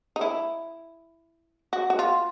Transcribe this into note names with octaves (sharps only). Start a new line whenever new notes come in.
D#4
E4
F#4
F#4
F4